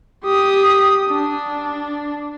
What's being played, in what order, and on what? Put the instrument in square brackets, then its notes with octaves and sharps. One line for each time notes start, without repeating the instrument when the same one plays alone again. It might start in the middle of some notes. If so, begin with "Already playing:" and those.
[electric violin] G4 D#6
D4